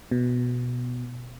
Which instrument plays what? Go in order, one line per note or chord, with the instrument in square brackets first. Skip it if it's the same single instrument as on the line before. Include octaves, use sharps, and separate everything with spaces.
[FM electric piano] B2